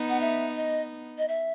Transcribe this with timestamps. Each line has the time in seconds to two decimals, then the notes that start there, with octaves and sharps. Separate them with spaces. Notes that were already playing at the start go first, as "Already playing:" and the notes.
Already playing: B3 D#4
0.09 F#5
0.21 E5
0.57 D#5
1.18 D#5
1.28 E5